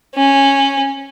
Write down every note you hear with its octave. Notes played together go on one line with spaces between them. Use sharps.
C#4